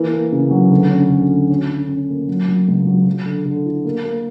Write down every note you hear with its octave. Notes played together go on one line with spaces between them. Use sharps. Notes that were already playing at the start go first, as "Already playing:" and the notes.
Already playing: E3 A#3
A#3
C#3
F#3
D2
C#4
D2
D3
C#4
C#4
C#4
A#3
F#3
F#3
C#2
F#3
F#3
D3
D3
E4
A#3
A#3